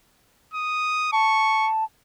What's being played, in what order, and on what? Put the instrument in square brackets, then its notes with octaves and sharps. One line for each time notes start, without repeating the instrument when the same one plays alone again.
[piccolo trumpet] D#6
[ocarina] A5 [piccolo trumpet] C#6